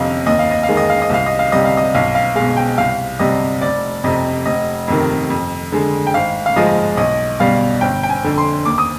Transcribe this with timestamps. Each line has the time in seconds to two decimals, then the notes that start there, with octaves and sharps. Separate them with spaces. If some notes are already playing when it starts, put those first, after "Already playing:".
Already playing: G1 F2 C3 D#5 F5
0.26 D#2 D#5
0.39 F5
0.51 D#5
0.63 F5
0.69 D#3 G#3
0.77 D#5
0.90 F5
1.02 D#5
1.10 C2 F5
1.26 D#5
1.39 F5
1.52 C3 G3 D#5
1.65 F5
1.77 D#5
1.94 B1 F5
2.15 F5
2.35 B2 G#3 F5
2.57 G5
2.78 C2 F5
3.19 C3 G3 D#5
3.61 F1 D5
4.04 F2 C3 D#5
4.46 F1 D#5
4.88 F2 C3 D#3
5.30 F2
5.72 D3 G#3
6.07 G5
6.14 G#1 F5
6.46 F5
6.56 G#2 F3 G#3 D#5
6.97 B1 D#5
7.40 B2 G3 F5
7.81 G1 G5
8.03 G5
8.10 G#5
8.24 F2 D3
8.38 C6
8.65 D#2 D6
8.78 D#6